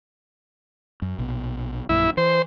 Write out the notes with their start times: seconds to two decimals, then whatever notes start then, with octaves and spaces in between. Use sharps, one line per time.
1.02 F#2
1.18 A#1 B2
1.89 A#1 F#2 A#2 E4
2.17 E3 C5